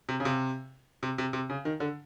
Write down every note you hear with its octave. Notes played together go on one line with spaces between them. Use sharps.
C3
C#3
C3
C3
C3
C3
C#3
D#3
D3